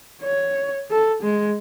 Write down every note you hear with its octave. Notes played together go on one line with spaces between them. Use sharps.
C#5
A4
G#3